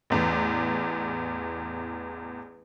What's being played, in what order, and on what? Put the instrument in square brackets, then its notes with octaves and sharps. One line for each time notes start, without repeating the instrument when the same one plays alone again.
[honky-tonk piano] A1 E2